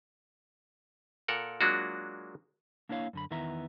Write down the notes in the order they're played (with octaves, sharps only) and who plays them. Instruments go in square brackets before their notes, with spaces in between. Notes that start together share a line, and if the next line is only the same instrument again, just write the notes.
[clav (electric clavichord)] A#2 A4 A#4 F#5
F#3 G#3 A#3 D4 F4 F#4
[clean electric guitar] A#3 D4 E4 C#5 F5
F#2 D3 B5
E2 D#3 B3 E4 E5 A#5